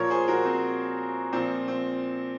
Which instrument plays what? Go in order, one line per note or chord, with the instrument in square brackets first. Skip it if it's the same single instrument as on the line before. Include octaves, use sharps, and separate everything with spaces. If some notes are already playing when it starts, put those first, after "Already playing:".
Already playing: [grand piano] A#2 F3 A#4 C#5
G#4 C5
F#4 A#4
C4
A#2 F3 C4
C4